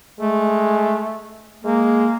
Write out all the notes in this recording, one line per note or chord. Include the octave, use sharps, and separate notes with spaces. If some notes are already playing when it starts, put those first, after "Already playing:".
G#3 A3
G#3 A#3